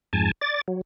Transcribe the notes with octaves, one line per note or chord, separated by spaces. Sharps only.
F2 G#2 G#5 A5
D5 A6
F#3